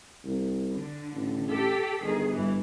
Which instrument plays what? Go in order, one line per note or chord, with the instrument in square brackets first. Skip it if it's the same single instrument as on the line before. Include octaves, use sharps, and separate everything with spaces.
[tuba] C2
[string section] D3
[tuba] A1
[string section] G4 A4 B6
[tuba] G1 [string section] D#3 G#4
[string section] G2 E3